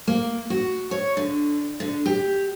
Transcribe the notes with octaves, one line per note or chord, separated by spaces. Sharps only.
A#3
F#4
C#5
D3
D3
G4